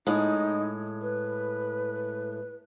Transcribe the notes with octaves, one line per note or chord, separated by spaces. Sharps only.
A2 G#3 D#4
B4